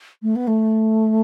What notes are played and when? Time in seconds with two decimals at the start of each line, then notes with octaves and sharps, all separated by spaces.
0.22 A3
0.35 B3
0.47 A3